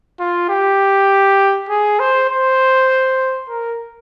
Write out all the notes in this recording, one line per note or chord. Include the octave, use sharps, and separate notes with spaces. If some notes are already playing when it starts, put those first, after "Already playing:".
F4
G4
G#4
C5
C5
A#4